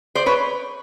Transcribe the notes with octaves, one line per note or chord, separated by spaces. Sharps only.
C5 D5
B4 C#5